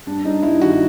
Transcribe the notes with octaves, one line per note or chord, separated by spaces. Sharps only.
G2 D4
G2 D#4
G2 E4
D#3 F#4